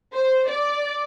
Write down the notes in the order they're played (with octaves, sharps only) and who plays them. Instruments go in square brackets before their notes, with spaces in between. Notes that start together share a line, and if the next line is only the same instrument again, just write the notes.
[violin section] C5
D5